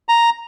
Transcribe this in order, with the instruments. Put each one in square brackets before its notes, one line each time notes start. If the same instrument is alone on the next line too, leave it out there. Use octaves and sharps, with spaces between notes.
[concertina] A#5